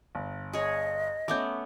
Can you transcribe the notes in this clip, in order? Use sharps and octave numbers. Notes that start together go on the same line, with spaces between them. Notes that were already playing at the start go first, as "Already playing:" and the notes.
G1
G#4 C#5 D#5
A3 B3 C#4 D6 G6